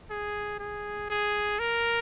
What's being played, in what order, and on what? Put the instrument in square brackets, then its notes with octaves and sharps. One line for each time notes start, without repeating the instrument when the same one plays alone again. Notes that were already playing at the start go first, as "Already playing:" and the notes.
[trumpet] G#4
G#4
G#4
A#4